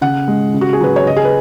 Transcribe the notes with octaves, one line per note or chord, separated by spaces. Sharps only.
C#3 F#5
G#3
C#3
F#4
G#4
F#3 B4
C#5
C#3 D#5
G#4
B4